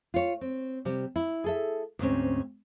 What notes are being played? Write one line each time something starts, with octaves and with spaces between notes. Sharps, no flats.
F4 C#5
C4
C3 G3 G4
E4
G#4 A4 E5
D2 G#2 C4 C#4